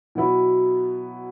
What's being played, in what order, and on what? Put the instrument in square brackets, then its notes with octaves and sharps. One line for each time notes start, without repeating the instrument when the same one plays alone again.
[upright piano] B2 F#3 B3 E4